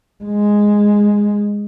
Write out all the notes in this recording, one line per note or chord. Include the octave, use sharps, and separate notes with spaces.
G#3